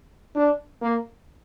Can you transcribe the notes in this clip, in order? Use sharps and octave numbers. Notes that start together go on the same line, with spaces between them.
D4
A#3